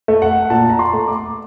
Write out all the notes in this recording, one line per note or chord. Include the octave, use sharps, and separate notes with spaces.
A3
F#5
A#2 A5
A#5
C6
A3
D6